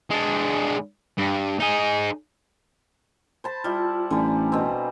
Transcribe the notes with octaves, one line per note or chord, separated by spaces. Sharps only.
G#3 D4
G2
D#4 G#4
C5 A5 B5
G3 E4 F4
A1 D3 G3 G#5 A#5
B2 C4